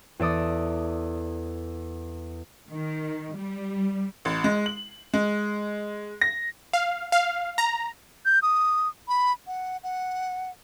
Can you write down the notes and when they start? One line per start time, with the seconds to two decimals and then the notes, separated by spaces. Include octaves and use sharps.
0.20 E2 A4 D5 D#6
2.69 D#3
3.36 G3
4.25 A1
4.44 G#3
4.66 F#7
5.14 G#3
6.21 A#6
6.73 F5
7.12 F5
7.58 A#5
8.25 G6
8.42 D#6
9.08 B5
9.47 F#5
9.83 F#5